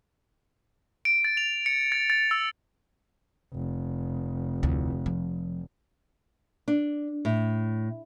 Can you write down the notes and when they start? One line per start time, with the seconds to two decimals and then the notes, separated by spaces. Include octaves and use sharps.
1.05 D7
1.25 A6
1.37 F7
1.66 C#7
1.92 A6
2.10 A6
2.31 E6
3.54 F1
4.63 D2 E4
5.06 F3
6.68 D4
7.25 A2